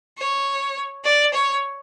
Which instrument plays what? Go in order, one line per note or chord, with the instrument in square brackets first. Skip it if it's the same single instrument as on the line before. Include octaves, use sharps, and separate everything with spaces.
[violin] C#5
D5
C#5